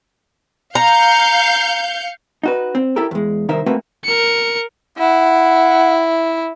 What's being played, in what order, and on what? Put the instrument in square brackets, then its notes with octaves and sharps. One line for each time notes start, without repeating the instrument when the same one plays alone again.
[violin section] F5 G6 C#7 [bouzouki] A#5
[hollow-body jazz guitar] D#4 F#4 B4
C4
E4 G4 A4 A#4
E2 G#3
C2 D#3 D#4 A#4 C5 E5
A3 A#3 C4 F#4 B4 E5
[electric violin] A#4 C#7
[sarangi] E4 [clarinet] F#5